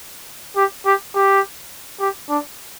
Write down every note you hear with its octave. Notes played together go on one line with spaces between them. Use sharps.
G4
G4
G4
G4
D4